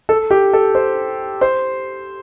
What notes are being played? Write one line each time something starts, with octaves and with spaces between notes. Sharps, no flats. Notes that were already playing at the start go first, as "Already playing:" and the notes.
A4
G4
A4
C5
C5